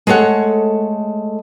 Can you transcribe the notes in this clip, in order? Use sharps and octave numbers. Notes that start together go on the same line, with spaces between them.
G#3 A3 A4 C#5 F#5